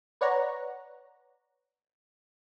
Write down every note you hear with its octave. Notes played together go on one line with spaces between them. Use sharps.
B4 C#5 D5 F#5 A#5